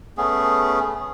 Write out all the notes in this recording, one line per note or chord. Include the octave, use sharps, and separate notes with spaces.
A3 B3 C#4 G#4